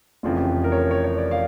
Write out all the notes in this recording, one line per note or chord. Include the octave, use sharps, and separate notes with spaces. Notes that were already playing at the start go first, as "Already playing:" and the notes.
F1 F2 C#3 E3 F4
G4
A#4
C#5
A#4
C#5
C#5
D5
F5